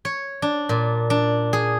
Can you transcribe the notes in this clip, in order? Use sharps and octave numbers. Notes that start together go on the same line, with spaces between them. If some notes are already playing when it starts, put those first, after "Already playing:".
C#5
D4
A#2
D4
G#4